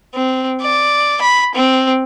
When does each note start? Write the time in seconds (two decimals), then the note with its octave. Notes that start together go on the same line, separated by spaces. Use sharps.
0.14 C4
0.62 D5
1.21 B5
1.55 C4